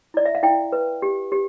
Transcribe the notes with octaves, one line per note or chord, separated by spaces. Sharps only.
E4 D5
E5
F5
E4 G5
B4
G4
G4